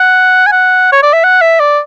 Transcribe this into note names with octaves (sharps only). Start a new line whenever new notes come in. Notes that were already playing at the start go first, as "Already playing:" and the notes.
Already playing: F#5
G#5
F#5
C#5
D5
E5
F#5
E5
D5